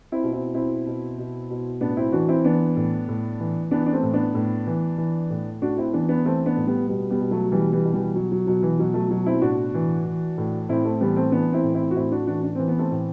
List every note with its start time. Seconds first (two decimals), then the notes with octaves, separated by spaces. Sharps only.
0.12 C4 E4
0.23 B2
0.33 C4 E4
0.54 B2 C4 E4
0.87 B2
1.18 B2
1.50 B2
1.81 A2 B3 D4
1.97 C4 E4
2.12 E3 D4 F#4
2.29 C4 E4
2.45 E3 B3 D4
2.76 A2
3.09 A2
3.40 E3
3.71 E3 B3 D4
3.86 D4
3.93 A3 C4
4.03 A2
4.14 B3 D4
4.35 A2
4.67 E3
4.98 E3
5.30 A2
5.62 A2 D4 F#4
5.77 C4 E4
5.93 E3 B3 D4
6.09 B3 D4
6.25 E3 A3 C4
6.46 B3 D4
6.57 A2
6.67 G3 B3
6.88 B2 G3 B3
7.10 G3 B3
7.21 B2
7.31 F#3 A3
7.51 B2 E3 G3
7.73 E3 G3
7.84 B2
7.94 E3 G3
8.15 B2 F#3
8.32 F#3
8.47 B2 F#3
8.63 E3
8.79 B2 F#3
8.94 F#3 A3
9.11 B2 F#3
9.26 C4 E4
9.42 A2 D4 F#4
9.74 E3
10.05 E3
10.38 A2
10.69 A2 C4 E4
10.85 A3 C4
11.01 E3 G3 B3
11.16 A3 C4
11.32 E3 B3 D4
11.53 C4 E4
11.64 A2
11.74 C4 E4
11.91 F#4
11.95 A2 C4 E4
12.12 D4 F#4
12.27 E3 D4 F#4
12.43 D4
12.55 E3 C4
12.68 B3
12.79 A3 C4
12.91 A2